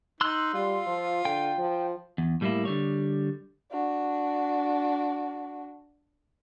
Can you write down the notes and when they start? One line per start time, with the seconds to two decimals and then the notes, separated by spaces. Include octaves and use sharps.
0.21 D#4 C6 E6 F#6
0.54 G3 F4
0.87 F3
1.25 D3 G5
1.58 F3
2.18 E2
2.41 A2 G3 A3 A#3 E4
2.65 D3 G3 C#5
3.71 D4 F#4